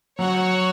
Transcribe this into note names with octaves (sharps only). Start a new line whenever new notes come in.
F#3 F#4 C#5 F#5